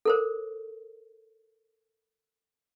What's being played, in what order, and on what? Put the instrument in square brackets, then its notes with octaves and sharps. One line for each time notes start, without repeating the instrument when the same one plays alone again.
[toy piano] A4 A#4 C5